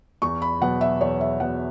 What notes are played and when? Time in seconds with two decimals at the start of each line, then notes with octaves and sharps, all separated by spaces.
0.22 E2 C#6
0.42 B5
0.61 B2 F#3 B3 F#5
0.81 E5
1.01 E2 C#5
1.21 E5
1.40 B2 F#3 B3 F#5